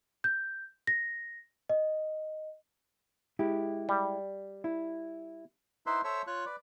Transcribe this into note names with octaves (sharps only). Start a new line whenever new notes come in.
G6
A#6
D#5
G#3 E4 G4
G3
E4
D#4 E4 B4 C5 E5 C6
A4 C5 C#5 E5 C#6 E6
F4 C#5 C#6 F#6
B4 D5